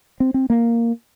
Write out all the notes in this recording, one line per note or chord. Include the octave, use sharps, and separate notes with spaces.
C4
C4
A#3